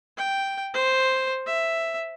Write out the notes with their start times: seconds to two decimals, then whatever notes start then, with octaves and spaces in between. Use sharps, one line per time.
0.18 G5
0.74 C5
1.46 E5